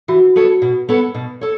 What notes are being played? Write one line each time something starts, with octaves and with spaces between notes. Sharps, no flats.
E3 F#4
B3 A4 C#5
B2
B3 A4 C#5
B2
A4 C#5